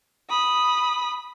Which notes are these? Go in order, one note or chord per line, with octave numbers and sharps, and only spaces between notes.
B5 D#6